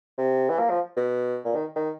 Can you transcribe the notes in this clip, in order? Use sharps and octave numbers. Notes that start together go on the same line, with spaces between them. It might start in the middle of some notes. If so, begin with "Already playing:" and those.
C3
E3
A#3
F3
B2
A#2
D#3
D#3